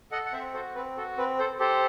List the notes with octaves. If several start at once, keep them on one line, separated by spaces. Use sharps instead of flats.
A4 D#5 F#5
F#5
C4 C5 E5
F#4 A4 C5
C4 B4
F#4 A4
C4 B4
A4 C5
G4 A4 C5